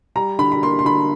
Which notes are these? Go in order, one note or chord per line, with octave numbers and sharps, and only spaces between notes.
G3 A#5
D3 B5
B5
A#3 C6
C6
D3 B5